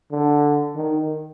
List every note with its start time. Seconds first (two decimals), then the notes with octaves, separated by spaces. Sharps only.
0.11 D3
0.76 D#3